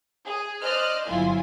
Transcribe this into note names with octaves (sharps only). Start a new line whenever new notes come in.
G#4
C5 D5 D#5 F6 F#6
G1 F#3 E4 F4 G#5 C6